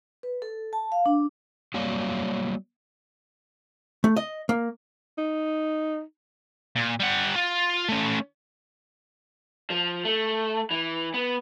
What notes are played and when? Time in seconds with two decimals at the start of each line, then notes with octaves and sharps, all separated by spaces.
0.23 B4
0.42 A4
0.73 A5
0.92 F5
1.06 D4
1.74 F#3 G3 A#3 C#5 D5 F5
4.04 A3
4.16 D#5
4.49 A#3
5.18 D#4
6.76 A#2
7.00 G3 F#5
7.36 F4
7.89 A3 C#4
9.70 F3
10.05 A3
10.71 E3
11.14 B3